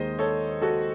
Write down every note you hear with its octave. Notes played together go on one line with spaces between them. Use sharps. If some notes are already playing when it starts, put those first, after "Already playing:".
Already playing: D#2 D#3 G#3 C5 D#5
A4 C#5
F#4 A4